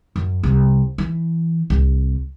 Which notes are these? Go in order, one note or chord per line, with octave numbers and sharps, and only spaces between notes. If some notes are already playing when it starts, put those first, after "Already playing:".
F#2
C2
E3
C2